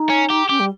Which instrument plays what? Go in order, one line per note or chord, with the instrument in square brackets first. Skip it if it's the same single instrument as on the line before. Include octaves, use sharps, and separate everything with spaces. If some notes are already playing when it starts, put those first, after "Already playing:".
Already playing: [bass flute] D#4
[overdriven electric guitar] C#4
G4
[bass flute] C#4 [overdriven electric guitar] G4
[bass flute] G3